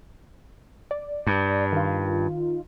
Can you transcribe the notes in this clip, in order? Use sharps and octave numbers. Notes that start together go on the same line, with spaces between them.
D5
G2
D#3 F4